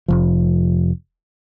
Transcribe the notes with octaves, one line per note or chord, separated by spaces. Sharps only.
F1 F3